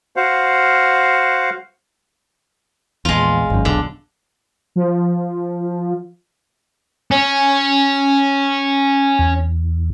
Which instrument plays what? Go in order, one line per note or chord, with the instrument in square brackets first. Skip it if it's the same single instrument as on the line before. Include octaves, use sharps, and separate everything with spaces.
[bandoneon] F#4 C5 F5 F#5
[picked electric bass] A#1 E2 [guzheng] G#3 F4
[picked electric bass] G#1 F#2
[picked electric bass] E1 B1 [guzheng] D3
[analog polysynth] F3
[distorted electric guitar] C#4
[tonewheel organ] E2